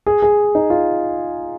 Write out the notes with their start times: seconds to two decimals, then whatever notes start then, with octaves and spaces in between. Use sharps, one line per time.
0.06 G#4
0.22 G#4
0.55 D#4
0.70 F4